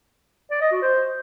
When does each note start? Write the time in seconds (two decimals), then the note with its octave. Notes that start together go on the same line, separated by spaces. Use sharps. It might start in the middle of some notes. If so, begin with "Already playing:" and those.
0.51 D5
0.61 D#5
0.72 F#4
0.82 C5